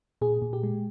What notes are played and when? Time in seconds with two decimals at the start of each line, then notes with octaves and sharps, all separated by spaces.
0.21 A#2 G#4
0.42 A#2
0.53 G4
0.63 G#3